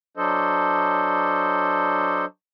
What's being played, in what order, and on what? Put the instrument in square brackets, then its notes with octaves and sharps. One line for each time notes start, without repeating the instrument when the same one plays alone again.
[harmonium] F#3 D4 A4 C5 D#5